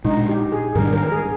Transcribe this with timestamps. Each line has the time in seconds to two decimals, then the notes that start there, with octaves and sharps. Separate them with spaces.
0.04 A#2 G#3 D4 D#4
0.29 G4
0.52 G#4
0.75 G#2 D#3 G3 D4 A#4
0.93 A#4
1.07 A#4
1.12 G#4